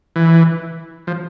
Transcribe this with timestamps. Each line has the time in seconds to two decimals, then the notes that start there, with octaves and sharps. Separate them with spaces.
0.16 E3
1.07 F3